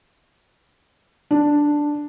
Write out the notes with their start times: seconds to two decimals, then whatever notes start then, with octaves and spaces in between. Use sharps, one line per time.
1.31 D4